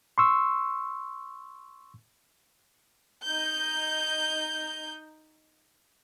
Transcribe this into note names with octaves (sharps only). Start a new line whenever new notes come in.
C6 C#6 E6
D#4 G6